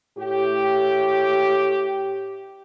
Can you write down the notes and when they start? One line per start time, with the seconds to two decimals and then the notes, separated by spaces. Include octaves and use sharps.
0.18 A2 G4